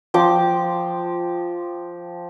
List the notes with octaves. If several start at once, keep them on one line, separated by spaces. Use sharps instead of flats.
F3 G5 C6 D6